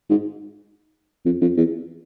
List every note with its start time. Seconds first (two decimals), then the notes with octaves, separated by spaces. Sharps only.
0.10 G#2
1.25 F2
1.41 F2
1.57 E2